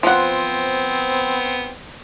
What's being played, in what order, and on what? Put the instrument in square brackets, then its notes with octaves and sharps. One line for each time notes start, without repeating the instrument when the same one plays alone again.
[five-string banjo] F3 F#5 [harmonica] B3 C4